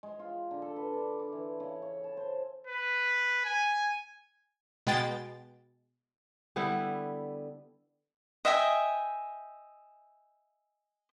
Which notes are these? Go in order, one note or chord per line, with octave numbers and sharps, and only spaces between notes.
G#3
F4
D3
A4
B4
D4
D6
E3
C#3
C#5
A5
C5
B4
G#5
B2 G#3 G5 A6
D3 G3 B3 E4
D#5 E5 G5 G#5